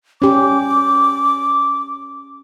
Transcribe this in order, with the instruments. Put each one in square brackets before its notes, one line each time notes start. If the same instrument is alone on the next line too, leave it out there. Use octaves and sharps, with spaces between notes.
[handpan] C#4 G4 [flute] D6